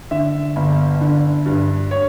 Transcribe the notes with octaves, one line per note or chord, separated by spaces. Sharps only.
D3 E5
G1
D3
G2
C#5